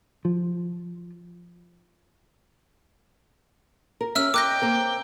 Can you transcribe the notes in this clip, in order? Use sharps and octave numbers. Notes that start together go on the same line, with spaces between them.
F3
A#4
C#4 G4 E5 E6 F6
A#4 D#5 G5 D6 F#6 A#6
A#3 C4 A#4